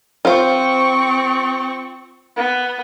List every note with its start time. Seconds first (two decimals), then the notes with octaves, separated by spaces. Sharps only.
0.25 C4 F4 C5 C#6
2.36 B3